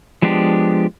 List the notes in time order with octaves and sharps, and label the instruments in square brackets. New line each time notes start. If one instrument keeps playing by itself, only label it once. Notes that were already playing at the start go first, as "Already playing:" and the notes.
[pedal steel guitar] F3 G#3 B3 D4 G4